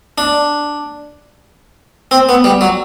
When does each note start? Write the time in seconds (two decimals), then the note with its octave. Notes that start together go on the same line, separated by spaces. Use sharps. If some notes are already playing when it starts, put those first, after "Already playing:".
0.18 D4
2.11 C4
2.29 B3
2.44 G3
2.61 F#3